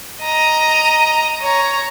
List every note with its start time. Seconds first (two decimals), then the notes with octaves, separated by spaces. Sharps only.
0.22 D#5 A#5
1.41 C#5 A#5